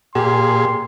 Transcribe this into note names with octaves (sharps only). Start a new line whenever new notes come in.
A#2 G4 G#4 C6